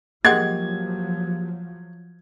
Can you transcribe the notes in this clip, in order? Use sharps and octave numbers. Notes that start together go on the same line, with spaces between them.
F3 F#3 G#3 A#3 G4 F#5 G#6